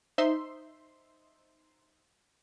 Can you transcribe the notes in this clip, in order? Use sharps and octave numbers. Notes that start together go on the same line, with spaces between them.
D#4 C5 E5 C6